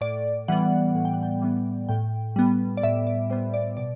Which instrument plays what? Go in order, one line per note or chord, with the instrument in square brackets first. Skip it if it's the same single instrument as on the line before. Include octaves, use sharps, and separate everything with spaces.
[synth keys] A2 D5
E3 G3 B3 F#5
A2
G5
F#5
G5
E3 G3 B3
A2 G5
G3 B3
D5
A2 E5
D5
G3 B3 C5
D5
B2 D5